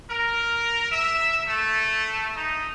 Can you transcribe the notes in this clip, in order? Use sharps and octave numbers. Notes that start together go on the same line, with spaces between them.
A#4
E5
A3
D#4